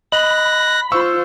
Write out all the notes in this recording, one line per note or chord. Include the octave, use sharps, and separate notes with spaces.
D#5 B5 F#6 A#6
F4 C5 C#6 E6